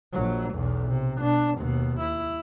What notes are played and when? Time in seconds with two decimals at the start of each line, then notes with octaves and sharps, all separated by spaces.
0.13 A#1 F#3
0.54 B1 E2
0.88 C3
1.19 B2 D4
1.58 D#2 B2
2.00 E4